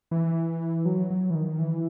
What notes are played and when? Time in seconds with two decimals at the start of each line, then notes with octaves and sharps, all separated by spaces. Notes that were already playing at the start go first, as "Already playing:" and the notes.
0.11 E3
0.85 F#3
1.10 F#3
1.30 E3
1.35 D#3
1.59 E3